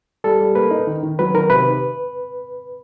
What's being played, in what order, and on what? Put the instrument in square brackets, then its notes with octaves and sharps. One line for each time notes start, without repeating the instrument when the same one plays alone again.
[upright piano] G3 [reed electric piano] A4
[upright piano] G3
[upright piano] A#3 [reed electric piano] B4
[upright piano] D#4
D#3
D#3
[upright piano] F#3 [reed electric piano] B4
[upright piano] D#3 [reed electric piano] A#4
[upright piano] C3 [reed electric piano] B4